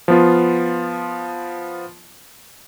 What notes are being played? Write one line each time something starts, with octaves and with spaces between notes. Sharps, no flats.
F3 B3 F4